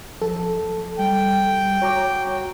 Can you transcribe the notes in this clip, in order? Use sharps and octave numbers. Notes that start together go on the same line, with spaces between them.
F3 A4
G3 G5
F#4 C#5 A#5 D6